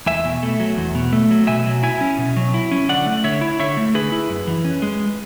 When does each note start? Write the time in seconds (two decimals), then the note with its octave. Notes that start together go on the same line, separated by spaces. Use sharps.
0.06 E2 E5 G#5
0.25 B2
0.43 A3
0.60 F#3
0.78 E2
0.95 B2
1.13 A3
1.31 F#3
1.47 B2 E5 G#5
1.66 F#3
1.83 E4 E5 G#5
2.01 C#4
2.18 B2
2.36 F#3
2.54 E4
2.71 C#4
2.89 D3 D5 F#5
3.06 A3
3.24 D3 C#5 E5
3.41 E4
3.60 D3 C#5 E5
3.77 A3
3.94 D3 G#4 B4
4.12 E4
4.29 F#2
4.47 E3
4.65 C#4
4.82 G#3